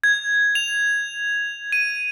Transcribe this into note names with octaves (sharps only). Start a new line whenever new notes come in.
G#6
F7
D#7